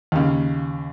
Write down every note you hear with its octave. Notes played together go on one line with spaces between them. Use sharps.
D#2 C#3